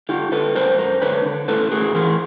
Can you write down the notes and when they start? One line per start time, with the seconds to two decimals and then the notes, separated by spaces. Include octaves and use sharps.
0.09 D3 F4 G4
0.32 D3 A4 B4
0.55 F#2 A#4 C5
0.79 F#2 A#4 C5
1.02 D3 B4 C#5
1.25 D3
1.48 A2 A4 B4
1.72 A2 G#4 A#4
1.95 E3 G#4 A#4